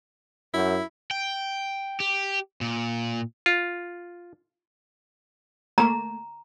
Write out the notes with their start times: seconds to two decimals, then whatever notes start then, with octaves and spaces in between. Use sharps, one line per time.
0.54 F#2 E4
1.11 G5
2.00 G4
2.61 A#2
3.46 F4
5.78 A3 A#3 A#5